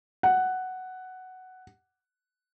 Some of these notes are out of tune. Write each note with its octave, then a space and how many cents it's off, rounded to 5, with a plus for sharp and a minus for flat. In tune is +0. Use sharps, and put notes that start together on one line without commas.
F#5 +5